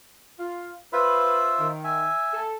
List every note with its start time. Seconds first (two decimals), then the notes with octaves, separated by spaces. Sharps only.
0.40 F4
0.93 F4 B4 C5 E5
1.60 D#3
1.84 E5 G#5
2.34 A4